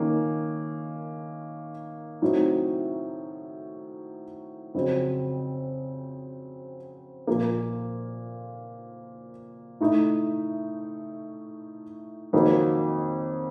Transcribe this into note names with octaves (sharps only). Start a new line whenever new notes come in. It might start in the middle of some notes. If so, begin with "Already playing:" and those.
Already playing: D#3 A#3 C#4 F4
A2 F#3 C4 D#4
F2 C#3 F#3 C4
A#2 F3 A#3
A2 A3 D#4
F2 D#3 F#3 A#3